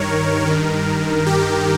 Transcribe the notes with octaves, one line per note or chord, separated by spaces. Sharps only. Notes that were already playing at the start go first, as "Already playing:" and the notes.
Already playing: G2 D#3 A#4 C#5
G2 D#3
G4